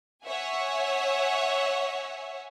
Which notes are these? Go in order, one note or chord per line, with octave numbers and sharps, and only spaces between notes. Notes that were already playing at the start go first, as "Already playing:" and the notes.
C#5 E5 F#5 G#5